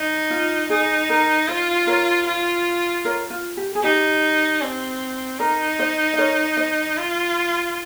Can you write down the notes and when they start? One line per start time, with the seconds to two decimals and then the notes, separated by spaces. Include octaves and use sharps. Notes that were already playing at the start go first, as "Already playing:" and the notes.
Already playing: D#4
0.30 F4
0.70 D#4 G#4
1.10 A#4
1.48 F4 C5
1.87 A#4 C#5
2.27 F4
3.05 A#4 C#5
3.30 F4
3.57 G4
3.75 G#4
3.83 D#4 G4
4.61 C4
5.40 D#4 A#4
5.79 C5 D#5
6.13 D#5
6.18 A#4 C#5
6.57 C5 D#5
6.97 F4